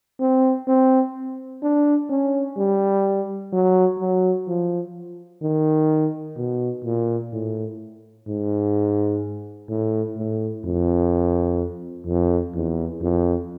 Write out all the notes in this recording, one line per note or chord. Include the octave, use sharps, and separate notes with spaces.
C4
C4
D4
C#4
G3
F#3
F#3
F3
D#3
B2
A#2
A2
G#2
A2
A2
F2
F2
E2
F2